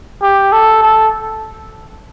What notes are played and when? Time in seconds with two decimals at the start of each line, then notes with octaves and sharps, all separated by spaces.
0.22 G4
0.52 A4
0.83 A4